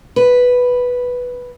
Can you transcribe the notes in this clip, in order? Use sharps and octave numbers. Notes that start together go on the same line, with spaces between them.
B4